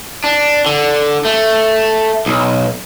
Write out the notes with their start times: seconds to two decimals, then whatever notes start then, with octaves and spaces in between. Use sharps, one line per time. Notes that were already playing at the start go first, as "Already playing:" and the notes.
0.24 D4
0.66 D3
1.25 A3
2.26 B1